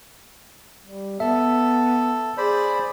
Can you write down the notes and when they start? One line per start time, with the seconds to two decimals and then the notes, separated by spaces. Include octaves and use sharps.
0.86 G3
1.20 B3 A4 E5
2.38 G#4 C5 D5 B5